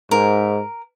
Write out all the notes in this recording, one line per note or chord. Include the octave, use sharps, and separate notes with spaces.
G#2 A#4